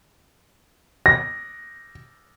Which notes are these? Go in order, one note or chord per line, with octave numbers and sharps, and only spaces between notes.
A#6